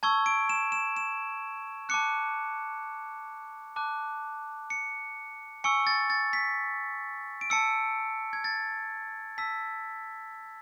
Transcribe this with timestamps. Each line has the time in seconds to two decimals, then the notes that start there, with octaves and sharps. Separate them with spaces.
0.03 A5 C#6 E6 G#6
0.26 D7
0.49 E7
0.72 E7
0.97 E7
1.89 A5 D6 F#6 C#7
3.76 A5 D6 F#6
4.70 C#7
5.64 G#5 C#6 E6 C#7
5.87 A6
6.10 A6
6.33 B6
7.41 D7
7.50 A5 E6 C#7
8.33 G#6
8.44 A6
9.38 A5 E6 B6